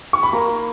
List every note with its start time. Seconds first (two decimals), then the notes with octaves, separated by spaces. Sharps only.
0.13 C#6
0.23 B5
0.33 A#3 A#5